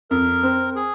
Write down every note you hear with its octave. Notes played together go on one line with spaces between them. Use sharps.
F2 A#4
C4
G#4